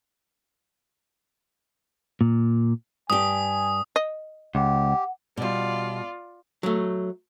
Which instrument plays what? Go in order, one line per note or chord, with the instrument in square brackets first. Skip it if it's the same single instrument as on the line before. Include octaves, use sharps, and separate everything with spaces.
[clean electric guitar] A#2
[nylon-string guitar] G2 G4 [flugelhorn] G#5 [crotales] D#6
[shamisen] D#5
[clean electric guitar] C#2 [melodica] G4 [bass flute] F#5
[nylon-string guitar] B2 G3 [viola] F4 D5
[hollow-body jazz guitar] F#3 A3